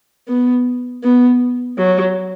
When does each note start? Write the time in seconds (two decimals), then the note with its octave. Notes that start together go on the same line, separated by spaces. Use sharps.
0.28 B3
1.03 B3
1.78 F#3